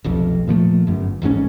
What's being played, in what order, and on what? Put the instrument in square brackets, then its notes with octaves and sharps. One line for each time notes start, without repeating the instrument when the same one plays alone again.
[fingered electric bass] F1 B1 F2
A#2 F3 G#3 A3
G1 F#2
D#1 A1 G#2 C#4